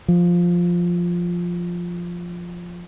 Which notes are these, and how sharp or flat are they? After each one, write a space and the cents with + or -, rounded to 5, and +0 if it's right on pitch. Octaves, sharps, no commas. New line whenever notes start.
F3 +0